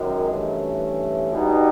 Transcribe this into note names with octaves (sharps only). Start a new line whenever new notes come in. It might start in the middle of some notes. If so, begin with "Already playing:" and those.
Already playing: F#2 D#3 G#3
G2 E3 A3 C#4 E4
B2 G3 B3 D#4 G4